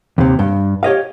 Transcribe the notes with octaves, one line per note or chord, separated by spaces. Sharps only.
D#2 C3
G2
G4 C#5 D#5 F5